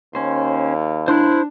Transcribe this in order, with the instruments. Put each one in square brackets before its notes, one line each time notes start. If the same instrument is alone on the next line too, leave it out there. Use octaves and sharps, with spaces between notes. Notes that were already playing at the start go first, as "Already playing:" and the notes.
[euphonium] D#2 [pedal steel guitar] C#4 C5
[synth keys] D4 [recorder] E4 [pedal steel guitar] C5 C6 F#6